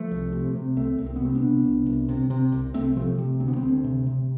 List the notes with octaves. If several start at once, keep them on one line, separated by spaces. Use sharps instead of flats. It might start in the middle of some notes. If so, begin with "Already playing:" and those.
Already playing: F3 A3
C2
C3
C3
C2 A3 C4
C2
C4
B3
C3 A3 C4
B3 D4
C3
C2
C2
C3
C3
C2
C2 A3 C4
C3 F3 A3
C3
D2 C4
B3
A3 C4
D2
C3
C3